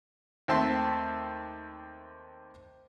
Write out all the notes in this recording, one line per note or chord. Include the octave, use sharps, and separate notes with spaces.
D#2 A3 C4 E5 A5 C6